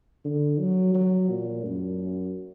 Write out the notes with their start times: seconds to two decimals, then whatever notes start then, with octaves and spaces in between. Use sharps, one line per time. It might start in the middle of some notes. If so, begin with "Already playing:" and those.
0.24 D3
0.59 F#3
0.94 F#3
1.30 A#2
1.65 F#2